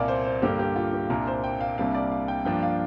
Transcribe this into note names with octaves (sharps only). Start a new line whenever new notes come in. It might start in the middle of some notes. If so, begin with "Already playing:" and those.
Already playing: C2 A#2 A#3 D5 F5
C5
C5
G2 D3 A#3 G4
G4
F4
G4
C2 A#2 A#3 D4 A#4
C5
G5
F5
C2 C3 G3 A#3 D4 F5
D5
F5
G5
G2 F3 A#3 D4 G5
F5